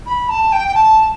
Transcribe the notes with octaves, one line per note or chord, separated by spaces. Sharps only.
B5
A5
G5
G5
A5